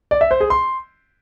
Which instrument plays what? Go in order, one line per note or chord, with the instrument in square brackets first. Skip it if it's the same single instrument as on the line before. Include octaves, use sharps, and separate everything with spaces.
[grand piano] D5
E5
C5
G#4
C6